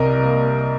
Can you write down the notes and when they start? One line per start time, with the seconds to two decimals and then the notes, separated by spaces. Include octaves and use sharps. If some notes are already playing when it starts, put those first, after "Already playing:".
Already playing: C2 G3 A#4 D#5
0.23 A#3